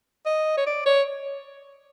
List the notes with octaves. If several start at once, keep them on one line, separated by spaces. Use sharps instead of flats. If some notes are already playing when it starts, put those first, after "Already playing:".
D#5
C#5
D5
C#5